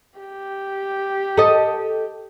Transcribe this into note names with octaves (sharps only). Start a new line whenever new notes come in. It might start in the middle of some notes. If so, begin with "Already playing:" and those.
G4
A4 D#5